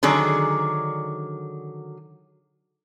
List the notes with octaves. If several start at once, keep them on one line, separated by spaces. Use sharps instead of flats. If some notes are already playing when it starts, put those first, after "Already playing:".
D3 D#3 F#3 G#4